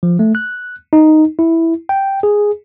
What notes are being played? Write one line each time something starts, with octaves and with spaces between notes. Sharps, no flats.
F3
A3
F#6
D#4
E4
G5
G#4